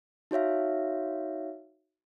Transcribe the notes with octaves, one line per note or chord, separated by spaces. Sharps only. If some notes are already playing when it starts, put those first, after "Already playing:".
D#4 F#4 C#5 E5 F5